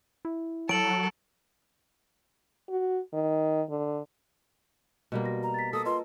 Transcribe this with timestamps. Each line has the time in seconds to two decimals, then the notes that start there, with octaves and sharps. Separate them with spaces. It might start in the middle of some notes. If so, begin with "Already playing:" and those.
0.25 E4
0.69 F#3 A4 D7 F#7
2.69 F#4
3.13 D#3
3.70 D3
5.12 B2 G3 A#3
5.24 F#4 A#6
5.43 A#5
5.54 A6 B6
5.73 A#3 A4 D#6
5.85 F4 B4 D#5 C6